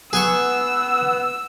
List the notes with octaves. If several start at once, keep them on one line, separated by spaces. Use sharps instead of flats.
B3 G#4 F#5 G#5 C#6 E6